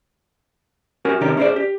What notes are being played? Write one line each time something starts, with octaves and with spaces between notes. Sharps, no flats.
C#4 F#4 G4 A#4 F#5 G#5
C3 D#3 C#4 D4 G4 A#4
C#4 E4 G#4 A#4 C5 D5
G4